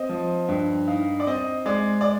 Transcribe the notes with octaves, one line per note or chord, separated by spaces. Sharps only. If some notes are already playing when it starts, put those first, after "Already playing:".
Already playing: C4 D#5
F3
G2
D#4 F5
D5
C4 D#5
G#3 D5
D5